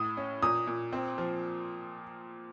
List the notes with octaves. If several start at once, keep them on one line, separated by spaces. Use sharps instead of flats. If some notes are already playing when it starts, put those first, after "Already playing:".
Already playing: A2 D#6
C#4
A#2 D#6
A#2
C4
F3